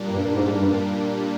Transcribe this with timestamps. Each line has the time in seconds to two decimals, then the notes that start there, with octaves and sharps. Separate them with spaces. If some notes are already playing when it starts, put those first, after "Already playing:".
Already playing: A#2 G3 A#3 D4
0.10 G2
0.34 G#2
0.57 G2